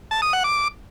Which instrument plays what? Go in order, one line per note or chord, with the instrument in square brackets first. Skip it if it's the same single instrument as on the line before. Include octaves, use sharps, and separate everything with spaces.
[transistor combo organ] A5
D#6
F#5
D6